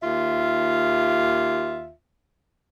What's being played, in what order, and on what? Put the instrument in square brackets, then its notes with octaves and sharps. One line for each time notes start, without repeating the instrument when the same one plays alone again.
[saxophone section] D#2 F4 E5